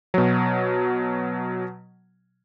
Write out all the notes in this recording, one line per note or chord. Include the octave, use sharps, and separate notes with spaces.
B2 F#3